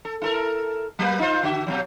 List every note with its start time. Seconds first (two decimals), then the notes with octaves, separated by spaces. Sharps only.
0.05 A4
0.22 E4 A4 A#4
0.99 F#3 A#3 B4
1.19 D#4 F4 C5
1.43 D3 F#4 E5
1.67 B2 E3 F#3